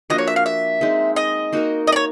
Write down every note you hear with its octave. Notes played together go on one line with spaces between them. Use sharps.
F3 A#3 D4 F#4 D#5
C#5
E5
F5
E5
G#3 C4 D#4
D#5
A#3 D#4 F#4 A#4
D#5
D5
C#5